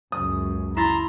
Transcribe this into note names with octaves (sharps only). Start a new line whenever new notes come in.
C#2 F#2 D#6
E4 A#5 C6 A6